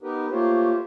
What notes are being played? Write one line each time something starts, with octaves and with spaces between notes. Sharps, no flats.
B3 D#4 G4 A#4 B4
A3 A#3 F4 G4 C5 C#5